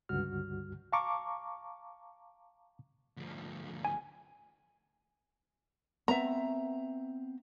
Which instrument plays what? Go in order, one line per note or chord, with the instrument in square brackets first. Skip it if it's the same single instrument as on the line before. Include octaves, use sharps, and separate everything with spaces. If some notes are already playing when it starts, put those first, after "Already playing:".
[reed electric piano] C#2 G2 D3 G3 F#4 F6
F5 A5 A#5 C#6 D6
[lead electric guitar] D2 F3
[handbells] G#5
[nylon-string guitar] B3 C4 F#5 [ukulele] E5 A#5